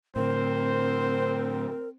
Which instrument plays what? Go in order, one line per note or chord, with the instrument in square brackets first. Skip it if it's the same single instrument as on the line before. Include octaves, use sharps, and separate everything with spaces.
[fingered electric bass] A2 D3 [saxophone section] C4 [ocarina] A#4 [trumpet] C5